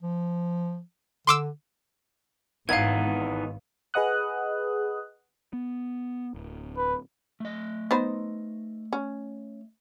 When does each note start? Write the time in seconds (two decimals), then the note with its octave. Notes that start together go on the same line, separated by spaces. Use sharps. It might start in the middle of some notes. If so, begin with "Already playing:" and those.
0.02 F3
1.27 D3 C6 D6 E6
2.69 G#1 E3 B3 D#4 F5 G#6
3.94 G#4 B4 D#5 F#5 D#6 F#6
5.53 B3
6.34 D1
6.77 B4
7.40 A3 D#5
7.91 B3 D#4 C5
8.93 C#4